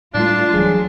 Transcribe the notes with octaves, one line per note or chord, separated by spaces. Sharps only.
A2 G3 A3 D4 F4
D1 E3 F#3 G3 G#4